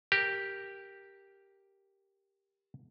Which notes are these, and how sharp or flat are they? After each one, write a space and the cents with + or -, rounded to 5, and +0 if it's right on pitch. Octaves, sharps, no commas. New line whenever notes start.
G4 +0 A#4 +0